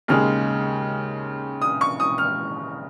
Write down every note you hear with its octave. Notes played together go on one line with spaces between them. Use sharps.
D#2 C#3 G#3 F6
D#6
C#6
D#6
F6